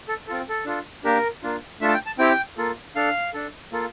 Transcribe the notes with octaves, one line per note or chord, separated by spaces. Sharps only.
A4
C4 F4 A4
A4
D4 F4 A4
A#3 D4 G4 A#4
A#3 D4 F4
A3 D4 F4 A4 E5
A5
G5
A5
C4 E4 G4 G5
A#3 F4 A4
D4 A4 F5
D4 A4
A#3 F4 A4